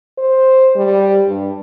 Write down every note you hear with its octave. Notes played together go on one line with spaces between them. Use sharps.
C5
G3
G2